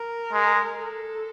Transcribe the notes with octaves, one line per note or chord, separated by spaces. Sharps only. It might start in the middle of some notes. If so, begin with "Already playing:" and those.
Already playing: A#4
G#3
A4